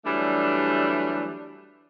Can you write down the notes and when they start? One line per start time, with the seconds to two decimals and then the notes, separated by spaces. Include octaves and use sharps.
0.05 E3 F#3 G3 A3 D4